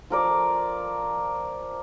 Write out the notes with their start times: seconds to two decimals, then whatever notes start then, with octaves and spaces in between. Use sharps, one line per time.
0.10 F3 A#4 D5